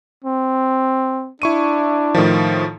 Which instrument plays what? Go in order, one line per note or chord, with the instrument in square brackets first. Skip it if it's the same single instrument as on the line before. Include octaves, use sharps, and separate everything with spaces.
[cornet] C4
[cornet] D4 [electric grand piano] E4 C#6 D#7
[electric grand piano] A2 D#3 F3